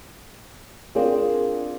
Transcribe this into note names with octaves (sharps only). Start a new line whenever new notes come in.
C4 D4 F4 G#4 A#4 D5